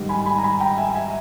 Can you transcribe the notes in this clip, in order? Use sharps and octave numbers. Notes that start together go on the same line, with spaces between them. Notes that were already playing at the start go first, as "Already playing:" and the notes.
Already playing: G#2 D#3 G3
G#5 B5
G#5 B5
A#5
G#5 B5
G5 A#5
E5 G#5
E5 G#5